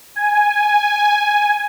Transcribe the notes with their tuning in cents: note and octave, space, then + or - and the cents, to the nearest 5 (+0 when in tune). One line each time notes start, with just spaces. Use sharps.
G#5 +0